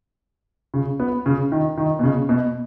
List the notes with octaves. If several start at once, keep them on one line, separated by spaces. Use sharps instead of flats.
C#3
B3
C#3
D#3
D#3
B2
C#3
B2